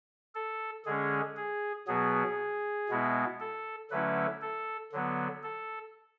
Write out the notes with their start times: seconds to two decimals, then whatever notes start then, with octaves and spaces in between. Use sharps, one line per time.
0.35 A4
0.86 D3 G#3 C#4 G#4
1.37 G#4
1.87 B2 F#3 B3 G#4
2.89 B2 G#3 B3 E4
3.40 A4
3.91 D3 F#3 A3 C#4 E4 B4
4.42 A4
4.92 D3 F#3 B3
5.43 A4